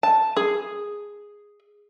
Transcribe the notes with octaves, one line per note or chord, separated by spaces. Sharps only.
A5
G#4